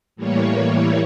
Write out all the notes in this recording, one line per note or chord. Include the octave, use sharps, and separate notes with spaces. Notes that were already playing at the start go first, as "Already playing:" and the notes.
A2 E3 G3 A#3 C#5